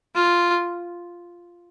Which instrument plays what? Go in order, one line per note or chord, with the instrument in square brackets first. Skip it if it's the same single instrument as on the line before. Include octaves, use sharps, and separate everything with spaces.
[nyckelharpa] F4